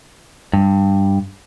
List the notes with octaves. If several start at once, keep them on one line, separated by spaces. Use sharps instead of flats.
G2